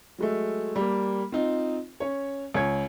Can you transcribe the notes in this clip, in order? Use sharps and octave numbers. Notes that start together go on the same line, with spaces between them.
F#3 G#3 A3
G3 A#3
C4 D#4 F4
C#4 C#5
C#2 C#5 G#6